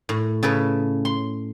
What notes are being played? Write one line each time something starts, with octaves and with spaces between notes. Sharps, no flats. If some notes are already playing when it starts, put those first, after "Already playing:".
A2
C#3 A4 B4
C6